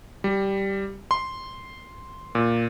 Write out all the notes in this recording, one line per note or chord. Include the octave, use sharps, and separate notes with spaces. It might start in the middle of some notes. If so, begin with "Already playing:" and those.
G3
C6
A#2